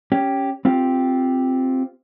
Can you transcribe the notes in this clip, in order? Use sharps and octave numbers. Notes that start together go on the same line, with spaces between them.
C#4 G4
C4 F4 G4